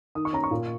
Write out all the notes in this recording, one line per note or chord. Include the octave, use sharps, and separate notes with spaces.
D#3 D#6
C#6
C#4 A#5
C#6
A#2